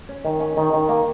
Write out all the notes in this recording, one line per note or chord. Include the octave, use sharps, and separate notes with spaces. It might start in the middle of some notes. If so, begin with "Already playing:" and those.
C#4
D#3
C#4
D#3
D#3
A#3